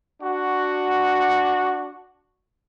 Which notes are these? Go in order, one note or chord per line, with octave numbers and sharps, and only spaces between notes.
D4 F#4